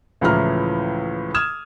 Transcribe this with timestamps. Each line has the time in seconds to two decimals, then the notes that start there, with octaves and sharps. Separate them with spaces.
0.21 C#2 A2 E3 F3 A#5 F6
1.34 D#6 F6 G#6 E7